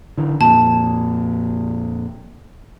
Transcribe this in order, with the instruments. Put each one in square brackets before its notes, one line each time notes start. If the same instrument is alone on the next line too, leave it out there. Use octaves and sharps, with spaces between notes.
[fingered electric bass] D3 E3
[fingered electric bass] F2 A#2 [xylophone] A5